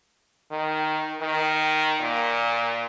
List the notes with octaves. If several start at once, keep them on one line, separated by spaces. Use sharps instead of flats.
D#3
D#3
A#2